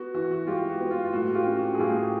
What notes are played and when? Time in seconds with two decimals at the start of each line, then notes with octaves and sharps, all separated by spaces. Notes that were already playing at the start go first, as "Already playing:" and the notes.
Already playing: B3 F#4
0.14 E3 F#4
0.31 F#4
0.47 G#3 F4 G4
0.69 F#4
0.80 B3
0.91 F4
1.05 F4
1.13 A2 F#4
1.35 F4 G4
1.46 C#4
1.57 F#4
1.75 G#4
1.79 A2 F4 G4